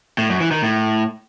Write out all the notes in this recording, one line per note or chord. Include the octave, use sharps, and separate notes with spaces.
A2
F#2
E3
D#3
A2